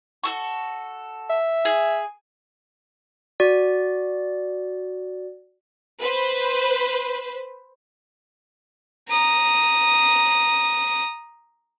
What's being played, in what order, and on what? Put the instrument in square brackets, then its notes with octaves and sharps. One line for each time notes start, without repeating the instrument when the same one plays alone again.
[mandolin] F#4 A4 C#6
[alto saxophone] E5
[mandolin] G#4
[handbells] F#4 D5
[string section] B4 C5
[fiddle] A#5 D#6